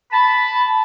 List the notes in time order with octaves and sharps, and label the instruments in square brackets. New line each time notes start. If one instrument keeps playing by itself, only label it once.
[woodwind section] A5 B5